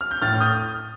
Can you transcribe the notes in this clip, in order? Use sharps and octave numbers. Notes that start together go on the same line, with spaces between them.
F6
G6
A2 F6 A6
F6
D#6 G6